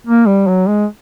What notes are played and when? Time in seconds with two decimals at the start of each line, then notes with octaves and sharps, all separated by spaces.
0.07 A#3
0.27 G3
0.47 F#3
0.67 G#3